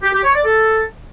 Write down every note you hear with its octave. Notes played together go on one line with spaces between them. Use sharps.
G4
G4
C#5
D5
A4